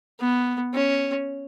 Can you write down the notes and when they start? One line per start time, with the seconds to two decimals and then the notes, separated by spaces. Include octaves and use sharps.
0.20 B3
0.74 C#4